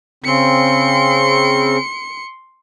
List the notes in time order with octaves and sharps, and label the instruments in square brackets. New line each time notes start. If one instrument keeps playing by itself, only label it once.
[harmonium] C#3 C4 [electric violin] C6 C#7